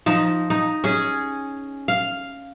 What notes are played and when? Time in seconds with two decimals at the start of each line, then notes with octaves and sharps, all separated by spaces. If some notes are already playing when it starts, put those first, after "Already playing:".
0.06 F3 D#4
0.50 D#4
0.84 C#4 G#4
1.88 F5